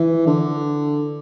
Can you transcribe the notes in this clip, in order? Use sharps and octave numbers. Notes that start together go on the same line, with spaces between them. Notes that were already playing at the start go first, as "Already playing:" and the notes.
Already playing: E3
D3